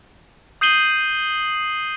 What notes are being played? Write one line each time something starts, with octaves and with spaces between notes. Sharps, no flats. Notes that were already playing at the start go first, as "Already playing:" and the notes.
D#6 G6 C7 D#7 F#7 G7